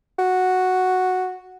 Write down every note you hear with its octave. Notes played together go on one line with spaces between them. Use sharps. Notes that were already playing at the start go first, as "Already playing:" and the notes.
F#4